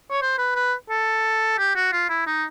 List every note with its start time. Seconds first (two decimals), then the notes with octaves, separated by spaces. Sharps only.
0.11 C#5
0.22 C5
0.38 B4
0.55 B4
0.90 A4
1.58 G4
1.76 F#4
1.93 F4
2.09 E4
2.26 D#4